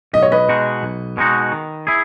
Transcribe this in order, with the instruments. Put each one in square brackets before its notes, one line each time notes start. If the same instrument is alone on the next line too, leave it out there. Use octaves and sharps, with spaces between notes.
[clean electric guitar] B1 [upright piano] D#5
[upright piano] C#5
B4 D#5
[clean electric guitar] B2 G#3 D#4 F#4
B1
B2 G#3 D#4 F#4
D#3
E4 G#4